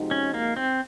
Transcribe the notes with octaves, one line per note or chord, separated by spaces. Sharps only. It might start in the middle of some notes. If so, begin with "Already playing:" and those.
Already playing: C3 F3 G#3 D#4 F#4
C#4
A#3
C4